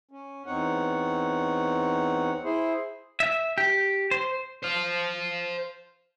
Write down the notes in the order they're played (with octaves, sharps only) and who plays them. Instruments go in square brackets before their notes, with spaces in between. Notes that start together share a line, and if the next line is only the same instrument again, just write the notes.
[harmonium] C#4
E2 C4 D#4 C#5 F#5
E4 G#4 C5
[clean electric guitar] E5
G4
C5
[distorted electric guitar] C5 F5